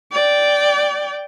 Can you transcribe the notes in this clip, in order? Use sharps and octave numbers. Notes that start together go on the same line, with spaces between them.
D5 G5